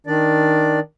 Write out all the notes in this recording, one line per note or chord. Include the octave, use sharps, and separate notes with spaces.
D#3 D4 D5